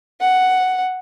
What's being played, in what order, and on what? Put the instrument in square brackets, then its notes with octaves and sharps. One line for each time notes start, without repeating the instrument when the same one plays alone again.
[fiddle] F#5